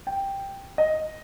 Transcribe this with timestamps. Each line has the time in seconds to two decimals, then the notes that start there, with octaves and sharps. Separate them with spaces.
0.07 G5
0.78 D#5